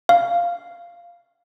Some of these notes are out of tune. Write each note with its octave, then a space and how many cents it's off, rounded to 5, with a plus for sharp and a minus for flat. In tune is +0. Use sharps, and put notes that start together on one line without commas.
F5 -10